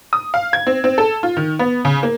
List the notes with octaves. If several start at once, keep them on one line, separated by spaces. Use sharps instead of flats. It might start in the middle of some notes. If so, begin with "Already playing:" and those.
D#6
F5
G#6
C4
C4
A4
F4
D#3
B3
C#3
A#3